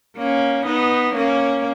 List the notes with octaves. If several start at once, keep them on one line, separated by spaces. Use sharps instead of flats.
A#3 C#4
B3 D#4
A#3 C#4